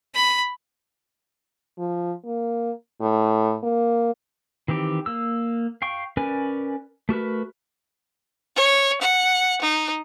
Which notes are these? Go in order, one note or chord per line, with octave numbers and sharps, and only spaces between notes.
B5
F3
A#3
A2
A#3
D#3 E3 C4 G4
A#3 E6
F5 G5 C#6
C#4 A#4 B4 D5 G#5
A3 F#4 A#4 B4
C#5
F#5
D#4